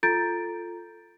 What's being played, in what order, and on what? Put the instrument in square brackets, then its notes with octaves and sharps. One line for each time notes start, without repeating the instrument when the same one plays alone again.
[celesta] F4 A4 A#5 G6 A6 D7